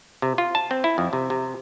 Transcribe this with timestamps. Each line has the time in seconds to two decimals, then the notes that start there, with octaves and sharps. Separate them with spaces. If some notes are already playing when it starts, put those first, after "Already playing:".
0.22 C3
0.38 F4
0.55 A5
0.71 C4
0.84 E4
0.98 F2
1.13 C3
1.30 C3